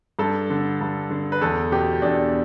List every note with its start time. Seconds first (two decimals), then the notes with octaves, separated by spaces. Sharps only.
0.19 G2 A4
0.50 D3
0.81 G2
1.11 D3
1.32 B4
1.41 E2 A4
1.72 B2 G4
2.02 E2 D4